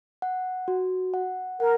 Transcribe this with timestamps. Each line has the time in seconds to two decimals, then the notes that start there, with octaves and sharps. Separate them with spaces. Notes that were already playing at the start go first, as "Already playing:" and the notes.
0.22 F#5
0.68 F#4
1.14 F#5
1.60 A#4 F#5